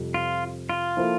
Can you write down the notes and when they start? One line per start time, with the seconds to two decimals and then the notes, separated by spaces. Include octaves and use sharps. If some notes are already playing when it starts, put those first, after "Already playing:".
Already playing: F2 C3 G3
0.14 F4
0.69 F4
0.97 F3 A#3 E4 A4